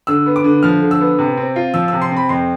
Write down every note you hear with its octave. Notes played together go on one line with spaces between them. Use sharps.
D3 E6
B3
D6
D3
F3 F6
D3
E6
B3
C3
C4
F4
F3 E6
E6
C3
C6
C4
B5
F2 C6